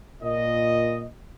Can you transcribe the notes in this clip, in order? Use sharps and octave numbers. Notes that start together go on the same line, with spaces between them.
A#2 D#5